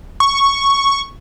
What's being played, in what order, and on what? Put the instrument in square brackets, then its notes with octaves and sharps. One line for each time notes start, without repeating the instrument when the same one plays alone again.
[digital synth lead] C#6